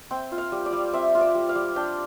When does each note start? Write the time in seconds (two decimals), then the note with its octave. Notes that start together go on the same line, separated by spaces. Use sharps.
0.11 C4 G5
0.32 F4
0.38 F5
0.52 G3
0.66 D5
0.73 G3
0.93 C4 E5
1.15 F4
1.21 D5
1.35 G3
1.49 F5
1.55 G3
1.76 D4 G5